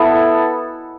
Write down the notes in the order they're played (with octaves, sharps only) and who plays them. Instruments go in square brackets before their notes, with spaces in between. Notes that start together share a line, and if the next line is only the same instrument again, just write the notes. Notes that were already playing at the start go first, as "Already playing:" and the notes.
Already playing: [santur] B3 E4 A4